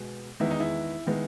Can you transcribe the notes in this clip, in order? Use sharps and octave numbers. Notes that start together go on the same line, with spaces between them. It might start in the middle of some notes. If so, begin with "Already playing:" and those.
Already playing: B2 G#3 B3
E2 D#3 G#3 B3 E4
D#4
E4
D#3 G#3 B3